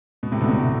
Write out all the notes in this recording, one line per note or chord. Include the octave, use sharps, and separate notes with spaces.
B2
A2 C3
B2 D3
A2 C3
B2